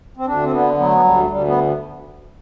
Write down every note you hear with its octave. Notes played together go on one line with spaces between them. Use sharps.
C4
D2 D4
C4
D3 B3
F#3 B3
A3
B3
D2 G3
D2 G3
B3